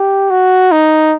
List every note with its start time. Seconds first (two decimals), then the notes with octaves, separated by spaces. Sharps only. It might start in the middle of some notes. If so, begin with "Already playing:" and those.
Already playing: G4
0.30 F#4
0.72 D#4